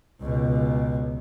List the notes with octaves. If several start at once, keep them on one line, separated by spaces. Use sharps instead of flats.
C#2 B2